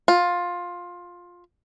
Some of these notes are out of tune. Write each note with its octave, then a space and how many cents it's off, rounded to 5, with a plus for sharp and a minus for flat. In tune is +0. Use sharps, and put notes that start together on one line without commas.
F4 +15